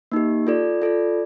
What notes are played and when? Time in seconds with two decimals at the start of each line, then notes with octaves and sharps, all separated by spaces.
0.12 A#3 D#4 G4
0.47 F4 A4 D5
0.82 F4 A4 D5